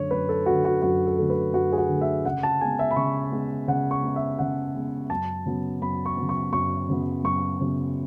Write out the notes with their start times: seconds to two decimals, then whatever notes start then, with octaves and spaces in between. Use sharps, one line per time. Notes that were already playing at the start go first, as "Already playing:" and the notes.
Already playing: F#2 D3 A3 C#5
0.11 F#2 B4
0.29 A4
0.46 D3 A3 F#4
0.65 F#4
0.82 F#2 F#4
1.06 A4
1.18 D3 A3
1.30 B4
1.54 F#2 F#4
1.73 G#4
1.78 F#4
1.89 D3 A3
2.01 E5
2.25 C#3 F#5
2.43 A5
2.61 G#3 B3 G#5
2.79 E5
2.91 B5
2.96 C#3 C#6
3.32 G#3 B3
3.68 C#3 F#5
3.91 C#6
4.03 G#3 B3
4.16 E5
4.39 C#3 F#5
4.75 G#3 B3
5.10 F#2 A5
5.46 C#3 F#3 B3
5.81 F#2 B5
6.06 C#6
6.17 C#3 F#3 B3
6.29 C#6
6.53 F#2 C#6
6.89 C#3 F#3 B3
7.24 F#2 C#6
7.61 C#3 F#3 B3